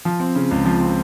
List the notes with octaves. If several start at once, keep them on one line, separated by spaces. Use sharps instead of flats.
F3
C4
C#3
C#2
F3
C4